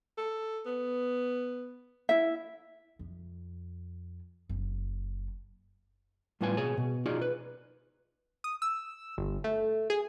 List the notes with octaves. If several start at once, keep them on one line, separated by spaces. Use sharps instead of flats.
A4
B3
E4 E5
F2
F#1
A2 G3 B3 F4 B4 G#5
B2 G#4 C#5 G#5
B2
D#4 F4 F#4 G#4 D5
B4
D#6
E6
G1
A3
G#4